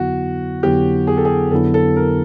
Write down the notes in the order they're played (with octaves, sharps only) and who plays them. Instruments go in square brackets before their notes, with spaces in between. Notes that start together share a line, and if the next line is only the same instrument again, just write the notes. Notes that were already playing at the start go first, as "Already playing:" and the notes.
Already playing: [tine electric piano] F2 D3 F#3 B3 E4 [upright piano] F#4
[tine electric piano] F2 D3 F#3 B3 E4 [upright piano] G4
[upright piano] G#4
A4
G#4
[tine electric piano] F2 D3 F#3 B3 E4 [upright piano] A4
[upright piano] A4
A#4